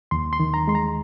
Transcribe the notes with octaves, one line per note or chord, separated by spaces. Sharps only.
D#2 C6
C6
D#3
A#5
G#3 C6
A#5